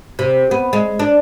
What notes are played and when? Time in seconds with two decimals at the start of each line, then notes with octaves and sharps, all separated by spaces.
0.19 C3
0.51 B3
0.73 G#3
0.99 D4